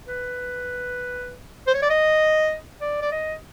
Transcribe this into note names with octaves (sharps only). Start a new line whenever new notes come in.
B4
C5
C#5
D5
D#5
D5
D5
D#5